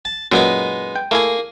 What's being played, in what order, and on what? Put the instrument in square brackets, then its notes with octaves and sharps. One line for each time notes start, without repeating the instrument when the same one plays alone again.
[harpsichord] A5
[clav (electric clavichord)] F#2 A#2 F#3 [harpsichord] G#3 B3 D#4
[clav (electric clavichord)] G5
[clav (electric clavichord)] A3 E4 G#5 [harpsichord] A#3 G#4